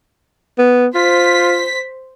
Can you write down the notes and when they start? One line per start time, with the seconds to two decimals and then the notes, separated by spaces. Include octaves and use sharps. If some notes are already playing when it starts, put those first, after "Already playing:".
0.58 B3
0.95 F4 C5 B6